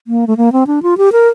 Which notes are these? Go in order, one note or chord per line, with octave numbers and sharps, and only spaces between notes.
A#3
A3
A#3
C4
D4
F4
G4
A#4